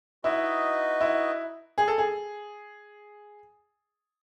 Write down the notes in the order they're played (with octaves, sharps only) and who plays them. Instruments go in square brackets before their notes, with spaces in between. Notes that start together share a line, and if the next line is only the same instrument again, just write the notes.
[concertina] D#4 F#4 B4 D#5 [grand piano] E4
[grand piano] E4
G#4
A4
G#4